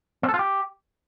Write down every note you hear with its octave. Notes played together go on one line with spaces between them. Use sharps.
C4
A4
F4
G4